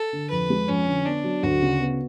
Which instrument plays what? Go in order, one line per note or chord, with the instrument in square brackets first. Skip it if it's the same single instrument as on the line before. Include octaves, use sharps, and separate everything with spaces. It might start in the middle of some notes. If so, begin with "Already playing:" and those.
Already playing: [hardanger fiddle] A4
[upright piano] D3
[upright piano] F2 [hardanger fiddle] B4
[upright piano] G#3
[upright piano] F2 [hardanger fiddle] C#4
[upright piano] D3
[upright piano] B3 [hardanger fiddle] D4
[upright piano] F#3
[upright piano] D2 [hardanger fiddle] F#4
[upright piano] C#3
B3